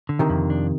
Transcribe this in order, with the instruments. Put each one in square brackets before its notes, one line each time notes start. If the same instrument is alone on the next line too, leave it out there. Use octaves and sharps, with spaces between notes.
[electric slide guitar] D3
[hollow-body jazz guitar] C3 D#3
[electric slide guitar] F2
D4